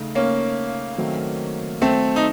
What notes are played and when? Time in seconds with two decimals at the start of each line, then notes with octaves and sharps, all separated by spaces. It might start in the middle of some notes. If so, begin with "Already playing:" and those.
Already playing: C#3 A3 D#4
0.15 A#3 C#4
0.98 D#3 F#3 A3 C4
1.82 A3 C4
2.16 D#4